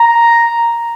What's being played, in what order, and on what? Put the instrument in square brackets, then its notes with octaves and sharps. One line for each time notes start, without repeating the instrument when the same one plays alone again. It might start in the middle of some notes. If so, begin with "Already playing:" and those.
Already playing: [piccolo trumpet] A#5